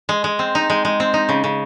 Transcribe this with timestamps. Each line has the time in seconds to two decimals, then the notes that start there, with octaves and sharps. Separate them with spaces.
0.09 G#3
0.24 G#3
0.39 C4
0.55 D#4
0.70 G#3
0.85 G#3
1.00 C4
1.14 D#4
1.29 C#3
1.44 C#3